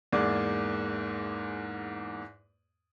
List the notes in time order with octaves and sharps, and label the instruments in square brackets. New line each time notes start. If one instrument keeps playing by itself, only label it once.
[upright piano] E2 G#2 A#3 G#4 D5